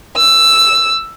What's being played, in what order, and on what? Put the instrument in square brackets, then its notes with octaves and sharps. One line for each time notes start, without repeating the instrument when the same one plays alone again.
[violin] E6